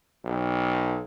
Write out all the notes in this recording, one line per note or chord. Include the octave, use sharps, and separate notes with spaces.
B1